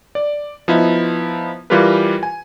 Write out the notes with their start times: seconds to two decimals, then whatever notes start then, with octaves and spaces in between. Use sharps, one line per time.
0.15 D5
0.68 F3 B3 D#4 E4
1.70 E3 G3 F4 G4 A#4 B4
2.23 G#5